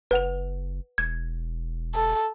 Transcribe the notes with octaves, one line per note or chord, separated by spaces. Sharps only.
F#1 B4 F#5 F7
E1 G#6
A4